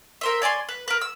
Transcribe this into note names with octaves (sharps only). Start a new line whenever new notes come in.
A#4 C5 E5
C#5 D5 G#5 C6
B4
A#4 B4
E6